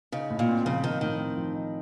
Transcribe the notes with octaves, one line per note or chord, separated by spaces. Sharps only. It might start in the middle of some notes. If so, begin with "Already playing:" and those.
C#3 D#4
A2
A#2
C4
C#3 F3
D#3 D#4
A2 D#3
C4
F3
D#4